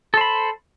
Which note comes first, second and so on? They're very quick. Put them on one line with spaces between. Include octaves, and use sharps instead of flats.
A4 C5 B5